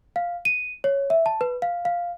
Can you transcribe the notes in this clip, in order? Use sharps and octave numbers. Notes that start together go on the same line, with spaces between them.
F5
D#7
C#5
E5
A5
B4
F5
F5